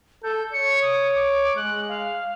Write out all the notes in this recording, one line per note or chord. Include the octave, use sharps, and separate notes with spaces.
A4 G6
C#5 C#7
D#6
D6
G#3 F#6
F5